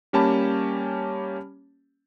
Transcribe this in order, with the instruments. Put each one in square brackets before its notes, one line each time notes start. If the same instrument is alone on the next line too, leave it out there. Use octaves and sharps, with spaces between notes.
[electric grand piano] G3 A#3 C#4 G4 A5 B5